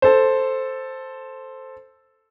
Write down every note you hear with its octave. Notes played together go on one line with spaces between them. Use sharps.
A4 C5